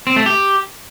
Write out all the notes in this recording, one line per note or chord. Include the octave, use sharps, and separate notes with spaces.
C4
A3
G4